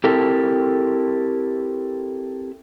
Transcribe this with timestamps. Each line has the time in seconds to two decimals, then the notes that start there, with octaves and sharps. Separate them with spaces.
0.04 C4 E4 G4 A4 A#4